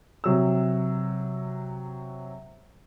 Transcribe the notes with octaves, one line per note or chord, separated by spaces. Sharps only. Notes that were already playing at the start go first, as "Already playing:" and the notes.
C3 F#3 E6